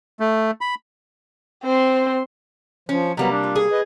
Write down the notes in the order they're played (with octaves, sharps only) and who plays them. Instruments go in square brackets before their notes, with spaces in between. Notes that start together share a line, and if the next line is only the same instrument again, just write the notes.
[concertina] A3
B5
[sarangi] C4 [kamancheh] C5 C6
[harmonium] F3 [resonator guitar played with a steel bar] C#4
[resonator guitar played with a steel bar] C3 G3 A#3 [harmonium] F#3 B3
[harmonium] D4
[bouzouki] F4
G#4
[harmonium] B4 D#5